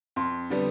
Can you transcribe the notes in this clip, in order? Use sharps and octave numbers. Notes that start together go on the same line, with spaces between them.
F2 C6
D3 G3 B3